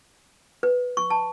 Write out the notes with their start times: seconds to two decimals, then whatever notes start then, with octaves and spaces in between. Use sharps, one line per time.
0.63 B4
0.97 C#6
1.10 A5